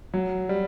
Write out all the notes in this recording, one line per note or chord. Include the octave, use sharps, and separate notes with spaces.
F#3
G3